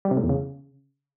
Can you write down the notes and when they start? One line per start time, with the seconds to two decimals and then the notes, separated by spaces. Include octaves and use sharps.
0.05 G3
0.11 C3
0.17 A2
0.23 E2
0.29 C#3